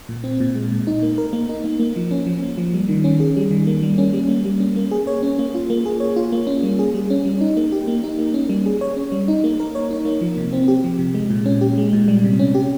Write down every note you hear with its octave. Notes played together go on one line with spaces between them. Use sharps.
A#2
C4
A#2
G#3
A#2
D#4
A#3
A#4
A#3
D#4
A#3
A#3
F3
C#4
F3
A#3
F3
G3
D#3
C#4
G#4
G3
D#3
A#3
G3
C#4
G3
A#3
G3
C#4
A#3
G#4
C#5
C#4
A#3
F4
A#3
G#4
C#5
F4
A#3
C#4
G3
G#4
G3
C#4
G3
D#4
A#3
G4
A#3
D#4
A#3
C#4
G3
G#4
C#5
C#4
G3
D#4
A#3
A#4
C#5
D#4
A#3
F3
C3
C4
G4
F3
C3
G#3
A#2
C#4
G4
G#3
A#2
G3
C3
C#4
G4